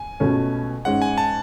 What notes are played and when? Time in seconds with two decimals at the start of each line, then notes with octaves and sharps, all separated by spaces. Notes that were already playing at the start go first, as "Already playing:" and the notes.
Already playing: G#5
0.20 C#2 B2 A3 C#4
0.85 G#2 G#3 C#4 F#5
1.02 G#5
1.18 A5